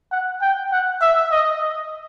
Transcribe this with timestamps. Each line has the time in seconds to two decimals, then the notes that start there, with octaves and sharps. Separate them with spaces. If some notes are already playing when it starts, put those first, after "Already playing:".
0.12 F#5
0.41 G5
0.72 F#5
1.01 E5
1.31 D#5
1.61 D#5